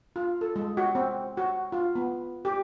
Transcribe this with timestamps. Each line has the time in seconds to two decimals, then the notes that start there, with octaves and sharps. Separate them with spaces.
0.16 F4
0.41 A4
0.56 G#3
0.77 F#4
0.95 C4
1.37 F#4
1.72 F4
1.95 B3
2.45 G4